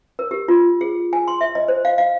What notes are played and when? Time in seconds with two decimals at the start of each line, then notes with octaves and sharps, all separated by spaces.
0.19 A#4
0.31 G4
0.48 F4
0.81 G#4
1.13 G#5
1.28 C6
1.41 E5
1.55 D#5
1.68 C5
1.85 F5
1.98 F5